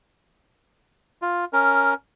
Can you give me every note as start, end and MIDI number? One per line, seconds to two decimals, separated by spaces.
1.22 1.45 65
1.53 1.94 61
1.53 1.94 70